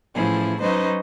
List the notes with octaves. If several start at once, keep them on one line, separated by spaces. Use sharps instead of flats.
A2 E3 F3 C#4 E4 G#4
F#3 C#4 D#4 B4 C5 D#5